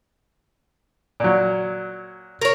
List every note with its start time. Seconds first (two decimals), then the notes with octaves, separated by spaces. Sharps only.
1.20 A#2 F#3
2.41 A#4 C#5